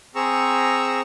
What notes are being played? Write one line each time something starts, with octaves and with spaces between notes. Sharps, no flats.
C4 G#4 A#5 C#6 E6